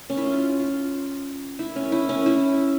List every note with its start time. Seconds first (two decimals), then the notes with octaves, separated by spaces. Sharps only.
0.10 C#4
0.17 E4
0.26 F4
0.60 F4
1.59 E4
1.76 C#4
1.92 E4
2.09 C#4
2.26 E4